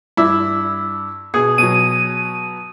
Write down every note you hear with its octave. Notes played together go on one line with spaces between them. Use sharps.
G2 E4 D6 E6
B2 G#4 D#6
B2 F#3 D#7